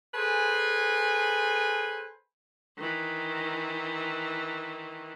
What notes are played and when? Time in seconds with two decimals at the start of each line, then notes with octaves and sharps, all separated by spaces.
0.14 G#4 A4 B4 C5 G#5
2.77 D#3 E3